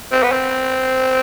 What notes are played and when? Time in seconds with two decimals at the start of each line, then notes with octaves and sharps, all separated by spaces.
0.12 C4
0.23 B3
0.32 C4